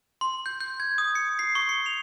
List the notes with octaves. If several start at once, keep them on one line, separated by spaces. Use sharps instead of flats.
C6
G6
G6
G#6
D#6
C#7
C7
C#6
C#7
F7